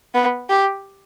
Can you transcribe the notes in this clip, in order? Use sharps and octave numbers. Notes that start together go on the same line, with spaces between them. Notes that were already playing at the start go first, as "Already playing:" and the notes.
B3
G4